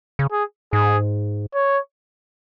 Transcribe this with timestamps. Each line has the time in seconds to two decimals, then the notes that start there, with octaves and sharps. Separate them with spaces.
0.19 C#3
0.32 G#4
0.73 G#2 G#4
1.54 C#5